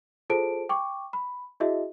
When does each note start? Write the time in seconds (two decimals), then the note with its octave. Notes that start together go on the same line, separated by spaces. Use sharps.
0.30 F4 G#4 A4 C5 A5 D7
0.69 G5 C#6 D6
1.13 B5
1.60 E4 F#4 G#4 D#5 E5